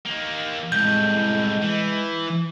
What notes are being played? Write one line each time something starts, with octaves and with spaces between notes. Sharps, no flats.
D#3 A#3
C2 A2 G#3 G6
E3